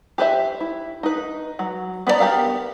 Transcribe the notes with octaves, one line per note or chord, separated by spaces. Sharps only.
G4 B4 C5 E5
E4
D#4 B4
F#3
B3 B4 C5 D5 A#5
B3 G4 A#4 F5